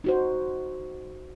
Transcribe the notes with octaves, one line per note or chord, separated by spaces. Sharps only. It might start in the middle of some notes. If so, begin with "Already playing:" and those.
D#4 F#4 C5